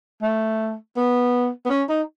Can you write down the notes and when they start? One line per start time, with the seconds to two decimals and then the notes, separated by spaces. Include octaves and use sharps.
0.22 A3
0.97 B3
1.66 B3
1.70 C#4
1.89 D#4